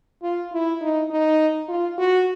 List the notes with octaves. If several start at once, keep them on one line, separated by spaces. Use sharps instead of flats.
F4
E4
D#4
D#4
F4
F#4